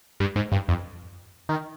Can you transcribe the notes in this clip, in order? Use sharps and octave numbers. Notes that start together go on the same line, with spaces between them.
G2
G#2
G2
F2
D#3